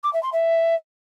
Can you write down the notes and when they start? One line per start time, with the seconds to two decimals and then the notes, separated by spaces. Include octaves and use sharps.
0.03 D6
0.13 E5
0.23 C6
0.32 E5